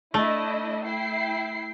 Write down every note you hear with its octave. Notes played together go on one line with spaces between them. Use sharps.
A3 D4 E4 D#5
E4 G5 C7